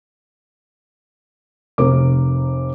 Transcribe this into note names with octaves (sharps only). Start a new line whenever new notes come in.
F1 A#4 D6